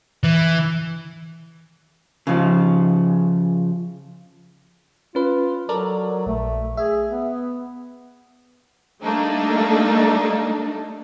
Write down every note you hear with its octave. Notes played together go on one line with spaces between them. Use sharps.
E3
C#3 F3
C#4 F4 B4
F#3 A4 A#4 D5
A#1 A3
G#4 E5
B3
G3 A3 A#3 D4 D#4